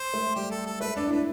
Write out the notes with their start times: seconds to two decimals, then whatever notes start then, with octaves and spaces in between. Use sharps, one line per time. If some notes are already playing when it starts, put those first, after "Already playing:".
Already playing: C5
0.14 A3
0.36 G3 G4
0.51 A4
0.66 A4
0.81 A3 B4
0.96 D4 A4
1.07 E4
1.11 D4 B4